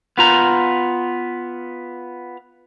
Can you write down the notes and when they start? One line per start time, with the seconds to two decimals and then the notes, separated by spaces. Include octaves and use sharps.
0.18 B3 F4 A#5